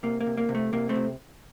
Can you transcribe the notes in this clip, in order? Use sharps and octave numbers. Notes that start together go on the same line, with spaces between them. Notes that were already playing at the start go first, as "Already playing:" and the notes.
C3 A#3
A#3
C3
A#3
C3
A3
C3 A#3
A3 C4
C3